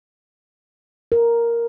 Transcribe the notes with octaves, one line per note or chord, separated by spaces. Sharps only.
A#4